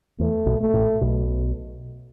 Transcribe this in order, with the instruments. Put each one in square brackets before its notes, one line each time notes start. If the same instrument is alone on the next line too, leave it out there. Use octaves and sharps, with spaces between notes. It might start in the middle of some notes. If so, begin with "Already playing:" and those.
[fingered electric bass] E2 E3 [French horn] A3
[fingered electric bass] B1 B2
[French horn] A3
[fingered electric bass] A1 A2
B1 B2